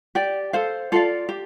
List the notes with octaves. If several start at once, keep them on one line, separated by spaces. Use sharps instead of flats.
G4 D5 G5
A4 C5 F5
F4 A4 D5 F5
G4